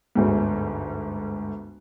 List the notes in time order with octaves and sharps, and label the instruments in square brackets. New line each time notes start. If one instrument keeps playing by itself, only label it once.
[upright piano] G1 D2 G#2